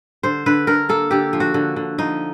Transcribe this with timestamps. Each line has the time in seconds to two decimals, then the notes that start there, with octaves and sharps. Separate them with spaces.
0.23 D3 C5
0.46 D3 B4
0.67 D3 A#4
0.89 A#3 A4
1.11 D3 G4
1.33 F3
1.40 F#4
1.54 D3
1.76 D3
1.98 F3 D#4